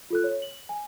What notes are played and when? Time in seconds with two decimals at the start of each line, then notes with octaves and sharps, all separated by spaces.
0.10 F4 A4 F#6
0.24 C#5
0.42 F#7
0.69 G#5